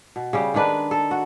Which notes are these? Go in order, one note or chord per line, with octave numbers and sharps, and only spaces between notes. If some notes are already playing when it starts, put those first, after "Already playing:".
B2
C#3 G3 G4
D#3 G#3 D4 B4
A4
F#4